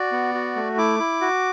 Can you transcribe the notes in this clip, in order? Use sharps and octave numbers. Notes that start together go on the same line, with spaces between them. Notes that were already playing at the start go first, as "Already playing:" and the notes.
Already playing: F#4 D5
B3
F#4
A3
E4 D6
E4
F#4